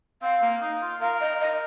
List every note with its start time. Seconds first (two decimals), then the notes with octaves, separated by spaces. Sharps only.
0.22 C4 F5
0.42 A#3
0.61 D#4
0.82 F4
1.01 A#4 F5
1.21 D#5
1.41 D#5